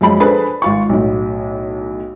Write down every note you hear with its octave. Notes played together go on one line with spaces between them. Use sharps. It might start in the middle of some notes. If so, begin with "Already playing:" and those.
F#2 F3 G#3 A5 B5
D4 G#4 A4 B4 C5 B5
G#1 F4 C#6
B1 A2